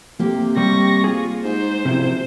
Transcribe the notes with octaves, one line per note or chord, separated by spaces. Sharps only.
C3 A#3 G4
G3 C#6 A#6
F4 G#4
G#2 C5
F#1 C3 F3 E4